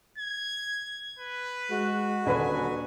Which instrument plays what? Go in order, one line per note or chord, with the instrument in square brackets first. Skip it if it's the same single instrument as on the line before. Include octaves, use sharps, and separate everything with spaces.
[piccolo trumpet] G#6
B4
[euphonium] G#3 [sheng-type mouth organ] F#4
[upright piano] D#1 B4 B5 [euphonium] D3 [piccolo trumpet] G#5